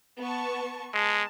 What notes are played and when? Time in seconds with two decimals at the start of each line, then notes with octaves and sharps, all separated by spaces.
0.19 B3 A5 C#6
0.94 G#3 A5